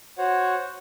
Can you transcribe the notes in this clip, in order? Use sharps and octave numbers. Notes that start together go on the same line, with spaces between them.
F#4 C5 C#5 F#5